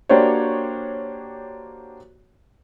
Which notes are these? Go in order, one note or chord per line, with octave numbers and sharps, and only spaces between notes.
A#3 D4 F#4 G4 C5 C#5